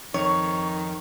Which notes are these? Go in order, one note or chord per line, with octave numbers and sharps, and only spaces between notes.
F2 D#3 C#5